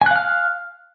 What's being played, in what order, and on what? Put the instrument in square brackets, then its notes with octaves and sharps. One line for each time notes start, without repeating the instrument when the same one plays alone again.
[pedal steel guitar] G#5
F#6
F5
F6